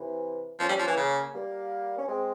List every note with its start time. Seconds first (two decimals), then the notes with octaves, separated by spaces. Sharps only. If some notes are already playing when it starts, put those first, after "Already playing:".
Already playing: C3 E3
0.60 F3 A#3 C#4
0.69 G3
0.79 F3
0.88 E3
0.97 C#3
1.34 G3 A#3
1.98 C#4
2.08 G#3 C4